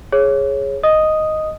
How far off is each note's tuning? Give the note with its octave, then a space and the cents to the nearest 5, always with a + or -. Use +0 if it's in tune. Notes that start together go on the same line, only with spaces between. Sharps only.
G#4 +0 C#5 -10
D#5 +0 D#6 +0